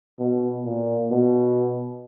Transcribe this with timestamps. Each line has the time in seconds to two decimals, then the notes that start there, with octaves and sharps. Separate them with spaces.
0.19 B2
0.65 A#2
1.11 B2